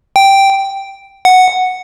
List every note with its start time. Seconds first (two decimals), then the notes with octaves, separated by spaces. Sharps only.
0.16 G5
1.25 F#5